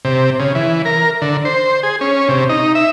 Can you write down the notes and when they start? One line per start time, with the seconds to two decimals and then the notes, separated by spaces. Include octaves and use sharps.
0.05 C3
0.40 C#3
0.55 E3
0.85 A#4
1.22 D3
1.45 C5
1.83 G#4
2.01 C#4
2.29 C3
2.49 D#4
2.75 E5